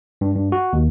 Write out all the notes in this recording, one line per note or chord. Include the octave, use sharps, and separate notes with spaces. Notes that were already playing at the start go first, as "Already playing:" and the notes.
G2
G2
F#4
D#2